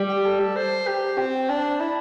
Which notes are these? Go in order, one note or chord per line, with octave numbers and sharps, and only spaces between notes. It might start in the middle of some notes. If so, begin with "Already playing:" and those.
Already playing: G3
G4
A4
C5
G4
C4
D4
E4